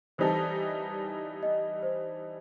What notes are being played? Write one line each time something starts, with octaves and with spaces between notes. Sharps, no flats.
E3 G3 D#4 A4 C5
D#5
C5